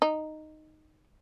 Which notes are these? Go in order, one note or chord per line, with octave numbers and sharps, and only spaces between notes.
D#4